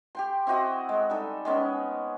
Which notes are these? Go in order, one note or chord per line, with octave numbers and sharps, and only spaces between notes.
G4 G5 C6
C4 E4 F#4 D#5
G#3
G3 D#4 A4
G#3 B3 C#4